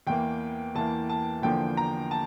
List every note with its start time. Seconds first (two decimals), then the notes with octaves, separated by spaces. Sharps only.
0.07 E2 E3 A#3 G5
0.75 E2 E3 A#3 A5
1.09 A5
1.42 E2 D3 F3 A#3 G5
1.77 A#5
2.11 A5